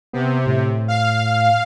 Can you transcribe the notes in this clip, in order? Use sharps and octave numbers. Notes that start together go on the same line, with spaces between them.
C3 B3
A2
F5